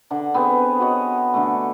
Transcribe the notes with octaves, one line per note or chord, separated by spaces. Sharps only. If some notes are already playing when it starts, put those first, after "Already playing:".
D3 F#5 A5
B3 C4 G#4 C5
F#4 C#5 D#5
D3 A3